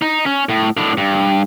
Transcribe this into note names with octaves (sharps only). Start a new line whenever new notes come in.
D#4
C#4
A2
A2 D4
G2